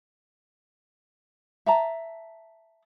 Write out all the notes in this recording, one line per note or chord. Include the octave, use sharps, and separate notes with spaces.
E5 A5 A#5